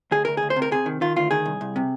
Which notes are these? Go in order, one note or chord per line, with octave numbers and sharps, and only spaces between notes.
D2 G#4
D2 A#4
G#4
D2
C5
C3
A#4
C3 G#4
D#3
D#3 F4
D2 F4
D#3 G#4
C2
C2
C3